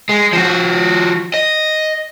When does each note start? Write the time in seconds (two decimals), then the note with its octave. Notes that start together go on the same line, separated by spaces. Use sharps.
0.09 G#3
0.33 F3 F#4
1.34 D#5